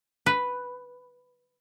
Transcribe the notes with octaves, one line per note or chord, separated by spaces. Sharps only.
B4